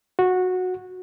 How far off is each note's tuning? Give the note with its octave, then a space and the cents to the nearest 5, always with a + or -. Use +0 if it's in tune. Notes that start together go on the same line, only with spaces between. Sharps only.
F#4 -15